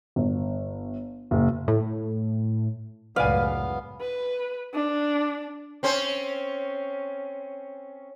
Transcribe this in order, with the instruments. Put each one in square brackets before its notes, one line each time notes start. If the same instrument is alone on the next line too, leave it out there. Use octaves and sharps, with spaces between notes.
[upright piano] G1
F#1
[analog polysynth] A2
[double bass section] C#2 F#2 A2 [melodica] B3 [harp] B4 D5 G#5 [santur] F5
[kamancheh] B4
D4
[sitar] C4 C#4 C5